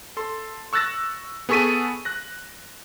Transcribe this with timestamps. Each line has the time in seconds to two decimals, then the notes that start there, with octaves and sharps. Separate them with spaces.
0.17 A4 C6
0.73 C#6 E6 F#6 A6 A#6
1.49 B3 G#4 A4 C#6 B6 D#7
2.05 F#6 A#6